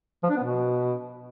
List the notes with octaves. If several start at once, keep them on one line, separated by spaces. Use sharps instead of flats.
F3
D4
B3
B2